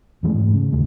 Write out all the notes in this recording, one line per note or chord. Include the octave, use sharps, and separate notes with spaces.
F1 E3 G#3 A3
G#2 A3
C#3
G1 D#2 C#3 A3